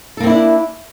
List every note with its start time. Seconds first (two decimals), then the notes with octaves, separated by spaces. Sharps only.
0.17 A4
0.20 A#3
0.23 C4
0.27 E4
0.30 D4